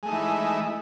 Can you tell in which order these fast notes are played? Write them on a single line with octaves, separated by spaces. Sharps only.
G#3 A3 D#4 E3 E4